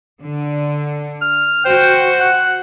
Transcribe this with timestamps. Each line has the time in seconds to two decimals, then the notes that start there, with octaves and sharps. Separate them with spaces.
0.23 D3
1.22 F6
1.65 F#4 C5 G5
2.20 F#5